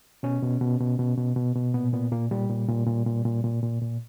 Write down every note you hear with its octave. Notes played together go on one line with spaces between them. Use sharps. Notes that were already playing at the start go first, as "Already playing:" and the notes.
B2 C#4
B2
B2
B2
B2
B2
B2
B2
A#2 B3
A#2 B3
A#2 A#3
A#2 G3
A#2
A#2
A#2
A#2
A#2
A#2
A#2
A#2